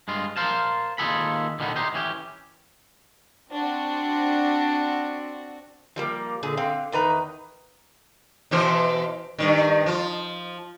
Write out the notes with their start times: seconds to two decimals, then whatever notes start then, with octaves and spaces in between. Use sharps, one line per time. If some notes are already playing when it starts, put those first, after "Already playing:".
0.08 G2 G#3 F4
0.37 A#4 C5 F5 A5
0.98 D#2 D#3 F4 G#4 A4 B5
1.59 B2 D3 D#3 G3 B3
1.76 D#4 G4 C5
1.94 E3 C#4 G4
3.49 C4 D4 F#4
5.96 F3 G3 A#3
6.43 A#2 D3 G#4
6.57 D3 C4 F5
6.92 E2 D#3 B4 A#5
8.51 B2 E3 C5
9.39 G2 C3 D#3
9.86 F3 F4